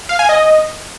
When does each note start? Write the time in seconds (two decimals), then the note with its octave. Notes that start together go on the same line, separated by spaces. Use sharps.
0.09 F5
0.19 G#5
0.29 D#5